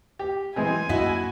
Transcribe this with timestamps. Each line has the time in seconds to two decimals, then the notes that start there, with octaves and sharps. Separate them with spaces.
0.19 G4
0.56 E3 G#3 C4 G#5
0.89 F#2 A#3 D4 E4 F#4 D#5